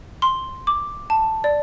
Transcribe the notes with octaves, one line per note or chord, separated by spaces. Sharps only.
C6
D6
A5
D5